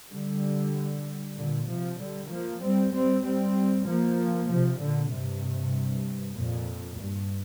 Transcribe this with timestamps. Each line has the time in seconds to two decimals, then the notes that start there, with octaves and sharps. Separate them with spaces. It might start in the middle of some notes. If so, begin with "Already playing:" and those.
0.12 D3 G3
1.37 A#2 D3
1.68 C3 F3
1.99 D3 G3
2.31 F3 A#3
2.61 G3 C4
2.93 G3 C4
3.24 G3 C4
3.86 F3 A#3
4.48 C3 F3
4.80 A#2 D3
5.11 G2 C3
6.36 F2 A#2
6.98 G2